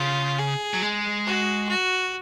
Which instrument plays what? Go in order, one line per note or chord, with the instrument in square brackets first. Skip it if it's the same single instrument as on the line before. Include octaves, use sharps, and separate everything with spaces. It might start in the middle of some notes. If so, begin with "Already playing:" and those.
Already playing: [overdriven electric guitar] C#3 [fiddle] F4
[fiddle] G#4
[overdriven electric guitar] F#3
G#3
[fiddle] F#4
F#4